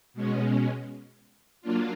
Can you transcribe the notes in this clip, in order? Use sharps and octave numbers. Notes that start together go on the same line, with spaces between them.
B2 G#3 C#4
F#3 A#3 D4 F4